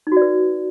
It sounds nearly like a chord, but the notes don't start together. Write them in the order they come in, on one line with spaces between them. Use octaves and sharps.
D#4 F#4 D5 B4